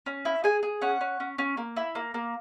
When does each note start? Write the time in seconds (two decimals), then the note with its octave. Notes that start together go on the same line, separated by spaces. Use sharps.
0.06 C#4
0.25 E4
0.44 G#4 G#5
0.63 G#4
0.82 C#4 F#5
1.01 C#4
1.20 C#4
1.38 C#4
1.57 A#3
1.76 E4
1.95 A#3
2.14 A#3